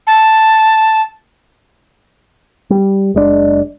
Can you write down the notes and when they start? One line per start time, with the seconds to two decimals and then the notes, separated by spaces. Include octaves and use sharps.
0.07 A5
2.70 G3
3.14 F#1 G#3 D4